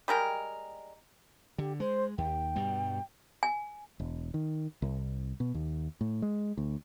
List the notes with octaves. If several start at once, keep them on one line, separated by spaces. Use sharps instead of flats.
G3 G#3 A#4 G5
D3 G4
G#3 C5
D#2 G5
G2 B2 G3
G#5
E1
D#3
C2
B2
D#2
A2
G#3
D2